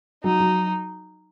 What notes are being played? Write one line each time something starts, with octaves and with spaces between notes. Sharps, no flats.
F#3 D#4
F#3